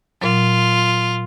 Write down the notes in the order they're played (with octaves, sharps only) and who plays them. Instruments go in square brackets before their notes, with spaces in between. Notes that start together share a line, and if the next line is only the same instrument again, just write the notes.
[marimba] A#2 F#3 [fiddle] F4